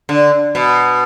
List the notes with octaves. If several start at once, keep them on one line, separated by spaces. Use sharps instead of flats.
D3
B2